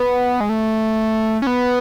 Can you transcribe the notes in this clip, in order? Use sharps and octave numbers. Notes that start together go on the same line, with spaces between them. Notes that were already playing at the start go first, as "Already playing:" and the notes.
Already playing: B3
G#3
A3
C#4
B3